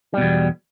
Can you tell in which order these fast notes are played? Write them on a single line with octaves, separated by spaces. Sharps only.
G3 B2 E2